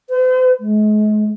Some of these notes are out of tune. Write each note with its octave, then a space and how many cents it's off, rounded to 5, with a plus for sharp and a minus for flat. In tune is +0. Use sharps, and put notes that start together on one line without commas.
C5 -45
G#3 +40